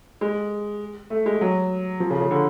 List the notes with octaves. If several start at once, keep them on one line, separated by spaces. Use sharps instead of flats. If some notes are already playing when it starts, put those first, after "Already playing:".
G#3
A3
G#3
F#3
F3
C#3
C#3
D3